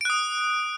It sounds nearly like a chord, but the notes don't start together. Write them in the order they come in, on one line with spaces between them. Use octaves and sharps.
D7 F#6 D#6